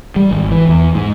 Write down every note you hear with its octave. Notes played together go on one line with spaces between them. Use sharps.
G3
G#1
E3
E2
G#2